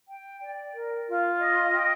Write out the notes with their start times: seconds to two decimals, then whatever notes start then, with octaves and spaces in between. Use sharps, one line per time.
0.09 G5
0.42 D5
0.74 A#4
1.07 F4
1.39 D#5
1.72 G5